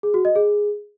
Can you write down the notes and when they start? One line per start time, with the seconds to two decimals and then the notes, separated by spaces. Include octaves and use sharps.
0.03 G#4
0.14 F#4
0.25 D#5
0.36 G#4